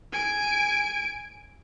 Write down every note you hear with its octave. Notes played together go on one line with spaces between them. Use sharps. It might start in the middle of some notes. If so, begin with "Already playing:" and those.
G#5 D7